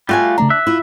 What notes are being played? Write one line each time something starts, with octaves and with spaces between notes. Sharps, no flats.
G3 A3 F4 F#4 F5 G#5
C#3 A3 D4 A#5
E5 F#6
E4 F4